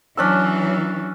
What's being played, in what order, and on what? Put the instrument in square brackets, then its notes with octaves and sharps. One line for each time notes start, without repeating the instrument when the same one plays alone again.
[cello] E3 F#3 [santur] C#4 D4 E6